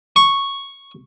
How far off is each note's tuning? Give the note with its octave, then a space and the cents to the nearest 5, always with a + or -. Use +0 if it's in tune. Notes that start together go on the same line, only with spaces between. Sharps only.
C#6 -5